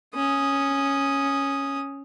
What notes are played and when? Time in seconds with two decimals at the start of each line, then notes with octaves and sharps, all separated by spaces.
0.15 C#4 D#6